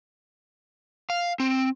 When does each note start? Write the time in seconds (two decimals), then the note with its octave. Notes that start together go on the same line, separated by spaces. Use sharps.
1.10 F5
1.40 C4